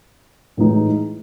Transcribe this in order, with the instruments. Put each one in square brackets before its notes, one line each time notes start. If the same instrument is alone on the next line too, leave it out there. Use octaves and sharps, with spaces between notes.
[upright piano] A2 E3 G#3 D#4